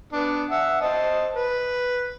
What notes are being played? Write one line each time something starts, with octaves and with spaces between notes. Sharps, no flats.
B3 D4
E5 F#5
C5 D#5 A5
B4